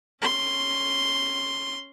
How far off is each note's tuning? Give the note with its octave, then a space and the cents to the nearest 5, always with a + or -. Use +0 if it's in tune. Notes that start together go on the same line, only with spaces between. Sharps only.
C#4 +0 C6 +0